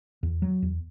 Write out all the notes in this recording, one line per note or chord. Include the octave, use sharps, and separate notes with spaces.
E2
F#3
E2